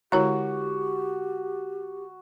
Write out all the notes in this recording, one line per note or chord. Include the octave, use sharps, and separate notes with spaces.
D3 G#3 E4 F#4 G4 C#5 A#5